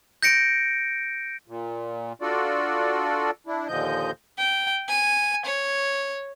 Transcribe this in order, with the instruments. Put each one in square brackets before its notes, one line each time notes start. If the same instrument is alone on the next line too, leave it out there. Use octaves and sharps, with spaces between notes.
[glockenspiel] G6 A#6 C#7 D7
[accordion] A#2
D4 F4 F#4 A4 D5
D4 E4
D#2 A#2 D3 F3 D#5 G6
[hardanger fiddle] G5
G#5
C#5